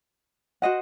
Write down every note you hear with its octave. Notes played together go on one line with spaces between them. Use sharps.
F#4 C5 D#5 F#5